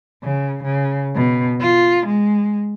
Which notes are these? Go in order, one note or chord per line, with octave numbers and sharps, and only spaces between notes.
C#3
C#3
B2
F4
G#3